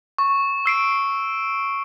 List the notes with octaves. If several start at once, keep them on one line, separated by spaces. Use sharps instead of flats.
C#6
E6 C7 D7